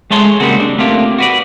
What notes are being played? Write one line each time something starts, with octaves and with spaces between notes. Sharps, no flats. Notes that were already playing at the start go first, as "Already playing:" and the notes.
G#3 A3 C#5 A5 C6
C#3 G3 G#3 A#3 C4 F#4
D4
A3 A#3 C4 F4 G4
F#4 B4 D5